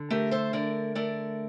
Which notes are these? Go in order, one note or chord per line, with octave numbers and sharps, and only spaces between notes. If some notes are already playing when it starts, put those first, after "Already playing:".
Already playing: D3
A3 G4 A#4
A4 C5
D3 A#4 D5
A3 A#4 D5